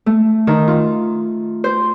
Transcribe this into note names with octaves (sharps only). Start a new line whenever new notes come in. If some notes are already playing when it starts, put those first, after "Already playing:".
A3
D#3
F4
C5